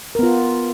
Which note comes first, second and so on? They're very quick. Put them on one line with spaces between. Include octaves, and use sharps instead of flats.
A#4 B3 F4